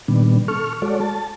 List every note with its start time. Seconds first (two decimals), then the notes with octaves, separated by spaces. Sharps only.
0.08 A#2 D#3 G3 B3 D4
0.48 A4 C#6 F6
0.82 G#3 F#4 A4 C#5 D5
1.01 A5